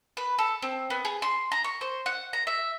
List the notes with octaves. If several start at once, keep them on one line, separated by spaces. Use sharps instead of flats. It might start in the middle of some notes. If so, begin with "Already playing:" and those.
B4
A4
C4
B3
G#4
C6
A#5
C#6
C5
F#5
A#5
E5